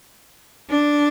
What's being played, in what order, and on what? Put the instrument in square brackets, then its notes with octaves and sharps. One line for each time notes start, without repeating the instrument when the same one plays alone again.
[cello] D4